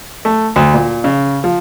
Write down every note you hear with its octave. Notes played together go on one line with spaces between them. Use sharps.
A3
D2
A#2
C#3
F3